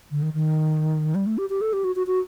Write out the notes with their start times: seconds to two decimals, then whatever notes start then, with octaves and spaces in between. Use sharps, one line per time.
0.11 D3
0.22 D#3
0.34 D#3
1.15 G3
1.26 A3
1.38 G4
1.50 G4
1.61 A4
1.73 G4
1.84 F#4
1.96 F#4
2.07 F#4